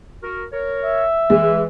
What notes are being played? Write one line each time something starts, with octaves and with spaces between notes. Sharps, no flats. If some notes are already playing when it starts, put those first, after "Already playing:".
F#4 A#4
A#4 C#5
E5
E3 G#3